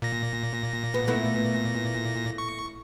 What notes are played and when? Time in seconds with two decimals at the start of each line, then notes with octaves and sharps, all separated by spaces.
0.02 A#2 A#6
0.94 B3
1.07 A3 B3 E4
2.38 C#6